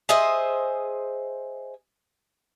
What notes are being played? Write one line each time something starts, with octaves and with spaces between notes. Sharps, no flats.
G#4 C5 D#5 E5